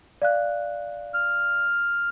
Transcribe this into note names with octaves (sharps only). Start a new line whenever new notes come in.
D5 F5 F#6
F6